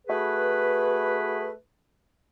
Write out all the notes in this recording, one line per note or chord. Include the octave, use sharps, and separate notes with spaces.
A3 F#4 G#4 B4